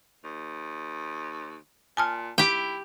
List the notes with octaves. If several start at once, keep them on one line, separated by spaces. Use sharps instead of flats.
D#2
A#2 G#5 A5 F6
E4 G4 G5